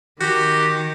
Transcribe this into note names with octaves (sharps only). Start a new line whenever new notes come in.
D#3 F#4 G4